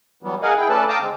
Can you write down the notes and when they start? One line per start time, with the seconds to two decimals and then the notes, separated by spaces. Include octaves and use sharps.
0.23 E3 F#3 G3 B3
0.42 G#4 A#4 D#5 F5 F#5 G#5
0.57 E4 G#4 G5
0.69 A3 C#4 A4 B4 D5 A5
0.89 F5 G5 A5 A#5 D6 D#6
1.01 D3 G#3 C4